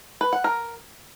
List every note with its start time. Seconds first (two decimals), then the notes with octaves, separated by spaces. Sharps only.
0.21 B4
0.33 F#5
0.44 A#4